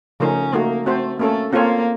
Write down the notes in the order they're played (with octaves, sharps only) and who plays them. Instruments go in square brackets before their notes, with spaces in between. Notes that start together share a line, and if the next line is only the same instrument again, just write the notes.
[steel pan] C#3 F3 A3 D#4 A#4 [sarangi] C#4
[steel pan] A3 D#4 F#4 [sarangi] A#3
[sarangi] A3 [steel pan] C4 F#4 C5
[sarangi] A3 [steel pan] A#3 C#4 A4
[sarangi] A#3 [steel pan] C4 F4 A4 C#5